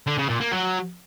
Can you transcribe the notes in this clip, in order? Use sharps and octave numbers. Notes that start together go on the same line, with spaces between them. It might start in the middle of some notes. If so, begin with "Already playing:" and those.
D3
C#3
A#2
A#3
F#3